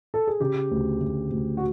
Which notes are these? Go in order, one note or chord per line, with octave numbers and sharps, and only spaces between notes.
A4
G#4
C#3 G4
D2
D2
D2
F#4